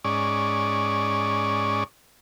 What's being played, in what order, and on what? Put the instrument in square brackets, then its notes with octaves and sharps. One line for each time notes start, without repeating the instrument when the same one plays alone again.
[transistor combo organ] G#2 C#4 D5